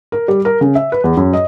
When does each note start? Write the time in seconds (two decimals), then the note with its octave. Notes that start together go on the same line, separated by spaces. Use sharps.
0.12 A#4
0.28 G3
0.45 A#4
0.61 C#3
0.75 E5
0.92 B4
1.04 E2
1.17 F#2
1.33 D#5